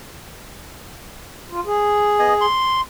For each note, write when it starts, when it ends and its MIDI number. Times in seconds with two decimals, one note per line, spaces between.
1.50 1.60 65
1.66 2.46 68
2.19 2.34 59
2.19 2.34 75
2.19 2.34 80
2.41 2.81 84